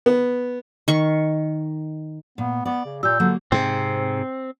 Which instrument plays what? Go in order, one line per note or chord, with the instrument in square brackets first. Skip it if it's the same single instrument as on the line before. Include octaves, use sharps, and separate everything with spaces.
[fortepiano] B3
[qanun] D#3 C#6
[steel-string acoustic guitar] A#2 [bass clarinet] B3
[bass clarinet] B3 [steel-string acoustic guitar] D5
[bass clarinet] C#3
[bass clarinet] A#2 [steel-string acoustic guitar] G4 [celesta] E6 G6
[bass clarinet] D3 [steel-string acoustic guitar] F#3 A#3
[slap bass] G#2 C3 [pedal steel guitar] C4